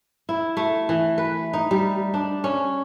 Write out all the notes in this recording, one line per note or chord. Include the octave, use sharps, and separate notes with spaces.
E4
A3
E3
B4
D#4
G3
D4
C#4